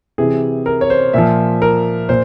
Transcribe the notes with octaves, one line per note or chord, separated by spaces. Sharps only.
C3 E3 G#4
A#4
C#5
C5
A#2 F3 E5
A#4
A#2 C5